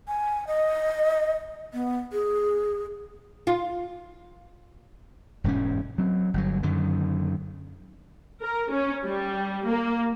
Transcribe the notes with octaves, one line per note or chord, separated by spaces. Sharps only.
G#5
D#5
B3
G#4
F4
E1 G#2 A#3 C#4
F#3 C4
G1 D3 F#3
F#2 D3 D#3
A#4
C#4
G3
A#3